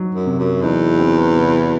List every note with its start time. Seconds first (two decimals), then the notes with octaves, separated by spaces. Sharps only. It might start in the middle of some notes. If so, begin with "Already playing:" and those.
Already playing: F#3 D#4
0.15 F#2
0.27 C3
0.39 F#2
0.62 E2 D#4
0.99 C4
1.36 C3